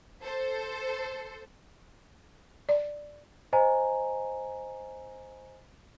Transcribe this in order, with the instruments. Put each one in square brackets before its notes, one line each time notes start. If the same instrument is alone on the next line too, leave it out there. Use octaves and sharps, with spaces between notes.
[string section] A4 C5
[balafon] D5
[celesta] C5 D#5 G#5 A#5